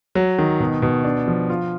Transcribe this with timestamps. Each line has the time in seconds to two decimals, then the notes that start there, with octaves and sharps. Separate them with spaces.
0.15 F#3
0.38 D#3
0.60 B2
0.82 B2
1.04 D4
1.28 F3
1.50 F4